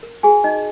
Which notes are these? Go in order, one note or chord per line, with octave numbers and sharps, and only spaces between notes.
A#4
F#4 G#4 G#5
D#4 F#4 D#5